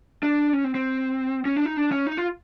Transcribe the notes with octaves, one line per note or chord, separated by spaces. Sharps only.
D4
C#4
C4
C4
C#4
D4
D#4
D4
C#4
D#4
F4